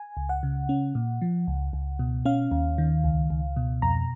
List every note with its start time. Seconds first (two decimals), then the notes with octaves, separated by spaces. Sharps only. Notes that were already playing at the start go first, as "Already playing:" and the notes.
Already playing: G#5
0.17 C#2
0.29 F#5
0.43 C#3
0.69 C#4
0.95 A#2
1.22 F3
1.48 C#2
1.73 C#2
1.99 B2
2.25 C#4 F5
2.51 D#2
2.78 D#3
3.04 C#2
3.30 C#2
3.56 B2
3.82 F2 A#5